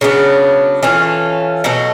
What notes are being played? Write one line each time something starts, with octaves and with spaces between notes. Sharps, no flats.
C#3 F#3 B3 D4
E3 A3 C#4 F4
B2 F#3 A3